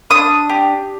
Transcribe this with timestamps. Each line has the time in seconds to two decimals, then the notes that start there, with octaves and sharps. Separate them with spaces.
0.10 D4 D#6
0.49 G4